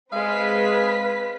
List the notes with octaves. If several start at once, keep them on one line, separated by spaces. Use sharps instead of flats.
G#3 C4 B4 F5 B6